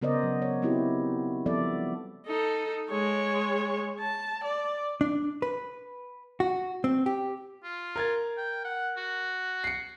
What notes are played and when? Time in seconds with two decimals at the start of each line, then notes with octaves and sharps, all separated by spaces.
0.02 C#3 B3 A#4 C5 D5 D#5
0.23 F#3
0.42 C#5
0.62 B3 C4 D#4 E4 F#4 G4
1.46 F3 G3 B3 A4 D5 E5
2.26 D#4 A4
2.91 G#3 C#5
4.00 A5
4.44 D5
5.01 D4
5.42 B4
6.40 F#4
6.84 C4
7.06 G4
7.64 F4
7.96 A#4 G#6 A6
8.37 G5
8.65 F#5
8.97 F#4
9.64 C7 C#7